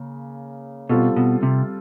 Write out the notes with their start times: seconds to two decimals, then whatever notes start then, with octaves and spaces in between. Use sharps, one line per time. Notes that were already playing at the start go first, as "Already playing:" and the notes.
Already playing: C#3 A#3
0.89 B2 G3 C4 F4 A4
1.16 B2
1.43 C3